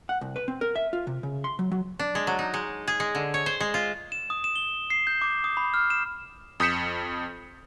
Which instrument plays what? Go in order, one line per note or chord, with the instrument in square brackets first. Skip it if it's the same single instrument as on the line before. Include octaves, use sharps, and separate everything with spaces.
[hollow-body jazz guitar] F#5
C2
B4
C4
A#4
E5
F4
C3
C#3
C6
F#3
F#3
[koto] D4
G#3
F#3
D#4
G#3
G#4
G#3
D3
C#5
C5
G#3
F4
[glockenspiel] E7
D#6
E7
G7
C7
G6
D6
D#6
B5
F6
E7
[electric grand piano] F2 D#6 G6 B6 C#7 E7